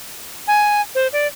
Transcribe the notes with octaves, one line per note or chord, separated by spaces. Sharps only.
G#5
C5
D5